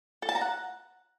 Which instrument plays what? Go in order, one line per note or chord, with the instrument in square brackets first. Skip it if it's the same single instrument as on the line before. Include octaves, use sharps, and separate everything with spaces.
[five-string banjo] A4
A5
A#5
F#5